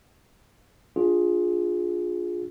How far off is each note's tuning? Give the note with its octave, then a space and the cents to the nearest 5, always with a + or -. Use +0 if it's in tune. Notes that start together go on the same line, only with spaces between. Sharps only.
D4 +0 F4 +20 G#4 +0